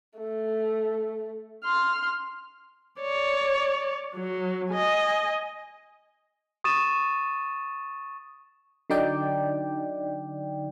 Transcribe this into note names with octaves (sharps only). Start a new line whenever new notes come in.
A3
C6 F6
C#5 D5
F#3
D#5 G#5
C#6 D#6 A6 D#7 E7
D3 F#3 D#4 D5 G5